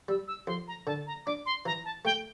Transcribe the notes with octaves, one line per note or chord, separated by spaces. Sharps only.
G3 E6
E6
F2 C6
A#5
D3 A5
A#5
D4 D6
C6
E3 A#5
A5
A3 G5